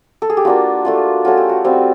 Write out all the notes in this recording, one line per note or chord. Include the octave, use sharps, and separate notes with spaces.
A4
G#4
G4
A#3 D4 F4 F#4
A3 D4 F4
A3 C#4 F4 F#4
G4
F#4
G3 C4 F4 F#4